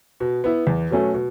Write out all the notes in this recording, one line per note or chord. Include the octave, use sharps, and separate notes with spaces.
B2
B3 E4
E2
B2 F#3 A3 C#4
B2